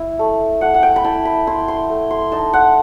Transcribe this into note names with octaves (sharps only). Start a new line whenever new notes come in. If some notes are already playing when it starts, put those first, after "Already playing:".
Already playing: E4 E5
A3
A3 F#5
F#5
G5
B5
E4 A5
B5
E4 C6
C6
A3
C6
D#4 A5
F#5